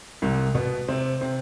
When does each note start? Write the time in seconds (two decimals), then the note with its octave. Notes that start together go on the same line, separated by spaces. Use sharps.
0.22 C2 C3
0.55 B2 B3
0.88 C3 C4
1.21 C3 C4